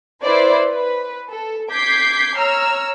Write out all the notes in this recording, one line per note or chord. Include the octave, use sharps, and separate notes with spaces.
E4 B4 C5 D5
B4
A4
D6 G6 G#6 B6 C7
C#5 A#5 E6 F6